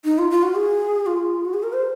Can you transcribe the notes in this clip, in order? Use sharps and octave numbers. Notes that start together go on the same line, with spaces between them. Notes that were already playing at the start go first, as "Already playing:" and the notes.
D#4
F4
F4
F#4
G#4
F4
F#4
G#4
A#4
C5